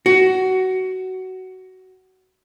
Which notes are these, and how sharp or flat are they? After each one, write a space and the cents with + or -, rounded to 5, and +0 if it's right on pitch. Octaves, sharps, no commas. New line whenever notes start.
F#4 +15